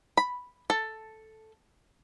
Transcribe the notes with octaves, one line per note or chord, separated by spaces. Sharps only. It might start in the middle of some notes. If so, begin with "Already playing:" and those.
B5
A4